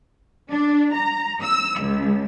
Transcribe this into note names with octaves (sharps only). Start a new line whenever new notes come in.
D4
A#5
E6
C#2